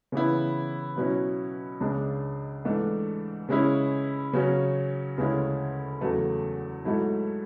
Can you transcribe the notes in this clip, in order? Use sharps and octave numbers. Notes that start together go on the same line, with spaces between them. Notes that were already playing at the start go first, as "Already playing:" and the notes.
C#3 E3 B3 E4
B2 F#3 C#4 E4
C#2 C#3 G#3 D4
G#2 E3 A3 D4
C#3 G#3 C#4 E4
C#3 F#3 C#4
D2 C#3 G#3 C#4 E4
E2 C#3 F#3 A3
G#2 F#3 A3 E4